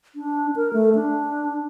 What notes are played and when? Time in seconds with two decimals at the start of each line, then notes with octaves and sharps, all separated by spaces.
0.16 D4
0.56 A#4
0.73 A3
0.95 D4